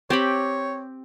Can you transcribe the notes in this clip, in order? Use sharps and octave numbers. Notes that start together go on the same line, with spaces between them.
C4 G4 C#5 B5